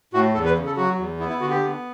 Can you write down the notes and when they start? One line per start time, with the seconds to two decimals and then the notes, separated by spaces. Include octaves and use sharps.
0.14 A2 F#4
0.34 E2 A4
0.45 B4
0.55 C#3
0.66 A4
0.77 F#3 F#4
0.98 E2
1.19 B3 E4
1.29 E4
1.40 D3 F#4
1.50 G4
1.62 B3